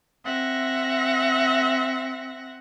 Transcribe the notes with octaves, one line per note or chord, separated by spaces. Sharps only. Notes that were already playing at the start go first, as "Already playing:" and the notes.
C4 E5 F#5 A#6